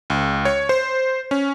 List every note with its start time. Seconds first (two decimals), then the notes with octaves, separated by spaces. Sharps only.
0.10 C#2
0.45 C#5
0.69 C5
1.31 C#4